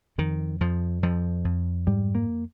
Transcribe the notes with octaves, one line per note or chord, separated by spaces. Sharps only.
F2 D#3
F2 F3
F2 F3
F2
G#2 G3
A#3